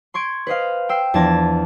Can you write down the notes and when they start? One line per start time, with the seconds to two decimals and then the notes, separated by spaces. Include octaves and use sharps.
0.14 C6 C#6 G#6 D7
0.47 B4 C5 D#5 F5
0.89 G5 E6 C7
1.14 E2 F3 D4 A5 G#6 A#6